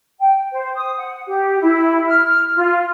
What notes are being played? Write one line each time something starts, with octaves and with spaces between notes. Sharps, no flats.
G5
C5
D#6
F#5
G4
E4
F6
F4